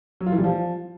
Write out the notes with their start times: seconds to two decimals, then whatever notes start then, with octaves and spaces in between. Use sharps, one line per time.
0.21 F#3
0.26 F4
0.32 E3
0.38 G3
0.44 F3